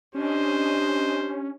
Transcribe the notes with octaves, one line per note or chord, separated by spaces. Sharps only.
C#4 D4 G4 C5 D#5